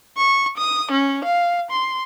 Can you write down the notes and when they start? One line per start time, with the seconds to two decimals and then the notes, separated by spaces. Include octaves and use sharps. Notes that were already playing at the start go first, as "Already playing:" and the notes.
0.17 C#6
0.57 D#6
0.91 C#4
1.25 F5
1.71 C6